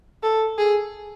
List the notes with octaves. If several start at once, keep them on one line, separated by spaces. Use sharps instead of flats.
A4
G#4